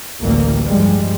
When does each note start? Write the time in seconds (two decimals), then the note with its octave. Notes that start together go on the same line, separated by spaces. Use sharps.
0.23 A1 D2 E3 G3 A#3
0.67 G2 F3 G3 G#3